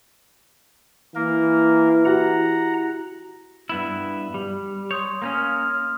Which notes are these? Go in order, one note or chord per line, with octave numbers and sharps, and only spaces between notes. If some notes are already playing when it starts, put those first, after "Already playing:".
E3 A#3 A#4
E4 F#4 G4 F#5 A#5
G2 B3 E4
G3
C#5 C6 D#6 G6
A#3 C4 C#4 D#6
F6